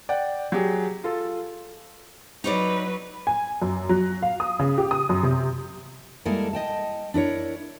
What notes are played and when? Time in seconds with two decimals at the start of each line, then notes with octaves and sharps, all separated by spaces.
0.09 D5 F#5 G5
0.52 F#3 G4 G#4
1.04 F4 A4
2.44 F#3 D#4 B4 C#5 D5
3.27 G#5
3.62 F#2
3.89 F#3
4.23 F5
4.40 D#6
4.59 C#3
4.78 G4
4.91 D#6
5.09 F#2
5.23 C3
6.25 G3 G#3 A#3 E4 A4 A#4
6.53 D#5 G5 A5
7.14 D4 E4 A#4 C#5